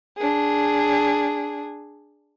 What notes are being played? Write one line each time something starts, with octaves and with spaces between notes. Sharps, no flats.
D4 G#4